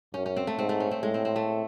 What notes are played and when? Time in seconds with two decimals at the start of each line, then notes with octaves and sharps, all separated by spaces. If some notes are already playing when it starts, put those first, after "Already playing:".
0.14 F#2 C#4
0.26 C#4
0.36 C4
0.47 A3
0.58 G#2 C4
0.69 A3
0.80 C#4
0.91 C4
1.03 A2 G#3
1.14 C4
1.25 C4
1.36 A3